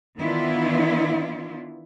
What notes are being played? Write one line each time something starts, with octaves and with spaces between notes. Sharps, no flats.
D#3 E3 B3 D4 E4 F4